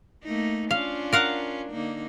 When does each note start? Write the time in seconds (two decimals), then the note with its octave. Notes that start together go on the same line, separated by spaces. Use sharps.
0.24 A3 A#3 D#4
0.71 C#4 D4 F4 F5
1.13 A#4 F5 F#5
1.71 D3 A#3 D#4